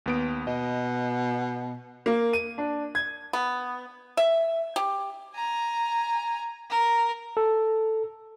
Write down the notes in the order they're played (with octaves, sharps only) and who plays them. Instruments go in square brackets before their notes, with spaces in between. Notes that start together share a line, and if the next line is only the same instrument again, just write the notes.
[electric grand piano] D#2 B3 D7
[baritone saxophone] B2 [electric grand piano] D#5
[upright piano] A#3
D#7
D4
G#6
[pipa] B3
E5
G4
[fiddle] G#5 A#5
A#4
[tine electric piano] A4